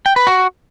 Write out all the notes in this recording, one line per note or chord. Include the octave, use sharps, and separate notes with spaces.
G5
B4
F#4